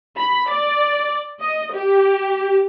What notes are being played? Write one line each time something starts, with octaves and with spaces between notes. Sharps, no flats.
B5
D5
D#5
G4